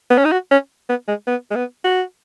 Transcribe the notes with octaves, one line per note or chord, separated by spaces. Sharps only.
B3
C#4
D#4
F#4
C#4
B3
G#3
B3
G#3
B3
F#4